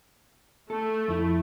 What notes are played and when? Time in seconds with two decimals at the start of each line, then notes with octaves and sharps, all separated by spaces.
0.70 A3 A4
1.08 F2 E4